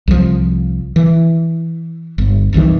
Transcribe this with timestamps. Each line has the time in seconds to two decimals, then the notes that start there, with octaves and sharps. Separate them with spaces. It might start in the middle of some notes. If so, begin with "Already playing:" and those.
0.08 C2 F3
0.96 E3
2.18 G1
2.53 F#1 C2 D#3 E3